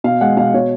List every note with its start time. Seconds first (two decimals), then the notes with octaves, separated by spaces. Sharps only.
0.04 B2 F5
0.21 G#3 F#5
0.37 B2 F5
0.54 B2 C#5